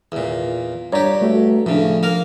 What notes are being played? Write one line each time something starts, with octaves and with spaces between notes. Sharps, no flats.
E2 A#2
G2 G4 C#5 D5 A#5
A3 F#4 A4
A2 C#3 F3 D4
A#3 A#4